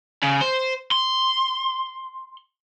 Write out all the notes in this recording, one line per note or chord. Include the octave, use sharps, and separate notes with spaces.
C#3
C5
C6